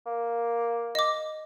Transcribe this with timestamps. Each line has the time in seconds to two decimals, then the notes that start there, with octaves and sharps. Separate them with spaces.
0.06 A#3
0.95 D#5 D6